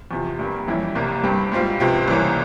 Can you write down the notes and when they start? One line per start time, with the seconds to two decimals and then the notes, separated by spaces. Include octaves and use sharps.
0.11 E2 C3 F3
0.39 G2 G3 A#3
0.67 F2 E3 G3 C#4 E4
0.95 C2 C3 G3 A#3
1.23 G2 G3 C4 G4
1.52 G#2 G3 C4 F4
1.80 C#2 C3 F3 C4
2.08 C2 C3 E3 A#3 C#4